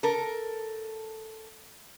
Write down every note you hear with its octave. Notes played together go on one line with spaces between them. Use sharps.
A4 A#4